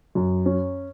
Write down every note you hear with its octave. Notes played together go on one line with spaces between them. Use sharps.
F#2
C#4